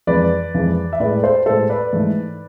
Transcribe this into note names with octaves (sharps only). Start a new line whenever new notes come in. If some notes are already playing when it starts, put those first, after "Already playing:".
F2 E3 G#3 B4 D5
F2 E3 G#3
E5
A2 G#3 B4 D5
A4 C5
A2 G#3 A4 C5
B4 D5
G#2 E3 A3